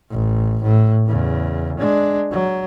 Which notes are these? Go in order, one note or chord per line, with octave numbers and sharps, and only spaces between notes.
A1
A2
E2 C#3
G#3 D4
F#3